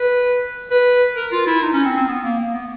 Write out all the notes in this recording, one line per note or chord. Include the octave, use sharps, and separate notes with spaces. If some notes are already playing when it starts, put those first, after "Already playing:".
Already playing: B4
B4
A#4
F4
E4
D#4
C#4
C4
C4
B3
A#3
A#3
B3